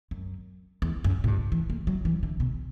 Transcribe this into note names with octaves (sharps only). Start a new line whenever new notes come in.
F#2
E2
F#2
A#2
G2
E3
A#3
F#3
E3
D3
B2